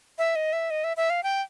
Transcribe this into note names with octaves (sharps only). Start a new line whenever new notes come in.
E5
D#5
E5
D#5
E5
E5
F5
G5